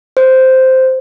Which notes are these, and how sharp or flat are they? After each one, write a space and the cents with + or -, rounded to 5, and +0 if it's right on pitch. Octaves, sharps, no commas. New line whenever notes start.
C5 -5